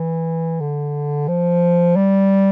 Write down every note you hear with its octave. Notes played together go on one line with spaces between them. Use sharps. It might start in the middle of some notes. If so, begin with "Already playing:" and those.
Already playing: E3
D3
F3
G3